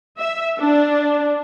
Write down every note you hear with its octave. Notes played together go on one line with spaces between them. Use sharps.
E5
D4